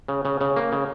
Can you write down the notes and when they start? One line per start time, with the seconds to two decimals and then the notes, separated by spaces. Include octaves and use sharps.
0.08 C#3
0.25 C#3
0.41 C#3
0.56 A#3
0.72 C#3